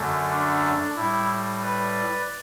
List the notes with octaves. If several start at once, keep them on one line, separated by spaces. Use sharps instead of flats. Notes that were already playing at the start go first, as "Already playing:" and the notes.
Already playing: F#2 D3 F#3 A3
D4
A2 G3 E4
B4 D5